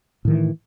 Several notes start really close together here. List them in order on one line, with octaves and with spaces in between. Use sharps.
A2 D#3 E3